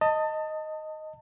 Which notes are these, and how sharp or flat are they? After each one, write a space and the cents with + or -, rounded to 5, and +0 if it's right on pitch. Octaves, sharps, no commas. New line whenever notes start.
D#5 +0 A5 +25